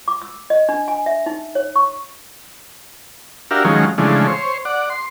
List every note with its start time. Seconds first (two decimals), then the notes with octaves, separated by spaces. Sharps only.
0.08 D6
0.22 E6
0.50 D#5
0.69 D4
0.88 G#5
1.06 E5
1.26 D#4
1.55 C#5
1.76 C#6
3.51 D4 F#4 G4 A#4 E5 F5
3.65 D#3 F3 F#3 G#3 C#4
3.98 C#3 E3 F3 G#3 A3 D4
4.27 C5 C#5
4.65 D5 F#5
4.90 C6